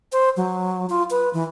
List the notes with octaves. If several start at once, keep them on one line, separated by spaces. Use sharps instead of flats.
C5
F#3
F4
B4
E3